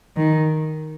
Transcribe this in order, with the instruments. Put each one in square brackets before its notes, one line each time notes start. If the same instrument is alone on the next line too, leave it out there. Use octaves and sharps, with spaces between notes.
[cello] D#3